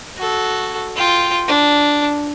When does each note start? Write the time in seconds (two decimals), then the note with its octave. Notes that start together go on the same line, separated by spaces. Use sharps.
0.18 F#4 A4
0.96 F4 G5
1.48 D4